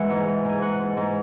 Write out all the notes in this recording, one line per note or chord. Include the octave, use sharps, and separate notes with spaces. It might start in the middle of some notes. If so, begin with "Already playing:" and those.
Already playing: E3 G#3 E5 F#5
G#2
G#2
G#2 G#5
G#2 F#5
G#2
G#2